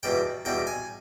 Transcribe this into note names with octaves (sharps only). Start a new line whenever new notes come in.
E2 B2 G3 G5
E2 B2 G3 G5
G#5